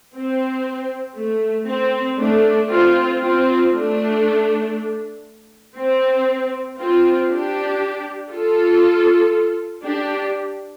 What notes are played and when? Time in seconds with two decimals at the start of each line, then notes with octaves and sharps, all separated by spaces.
0.14 C4
1.16 A3
1.67 C4
2.18 A3 D4
2.69 C4 F4
3.20 C4 F4
3.71 A3 D4
5.76 C4
6.78 C4 F4
7.29 D4 G4
8.31 F4 A4
9.84 D4 G4